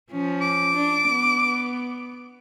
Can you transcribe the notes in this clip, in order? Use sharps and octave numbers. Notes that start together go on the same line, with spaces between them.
F3 C#4
D6
D4
B3